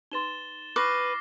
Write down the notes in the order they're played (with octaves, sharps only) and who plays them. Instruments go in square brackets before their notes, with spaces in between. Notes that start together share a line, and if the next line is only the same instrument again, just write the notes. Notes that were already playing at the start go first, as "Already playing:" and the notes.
[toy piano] D#4 B4 C6 [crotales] A6 E7 G7
[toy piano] E4 C#6 [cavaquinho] B4 [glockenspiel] D6 [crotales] F6 A#6 C7